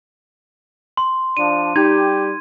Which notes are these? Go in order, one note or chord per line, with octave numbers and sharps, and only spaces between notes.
C6
F3 D4 D#7
G3 D#4 G4 G#6